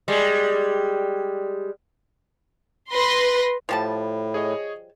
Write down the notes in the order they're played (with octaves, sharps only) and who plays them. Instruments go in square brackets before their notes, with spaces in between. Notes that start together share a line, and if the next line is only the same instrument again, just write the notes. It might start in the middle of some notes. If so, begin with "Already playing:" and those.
[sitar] G3 G#3
[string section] B4 C6 A#6
[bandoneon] A2 [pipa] F3 G3 A5
[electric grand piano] G#4 C#5 D#5